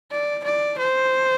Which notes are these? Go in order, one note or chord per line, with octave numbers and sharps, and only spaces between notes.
D5
D5
C5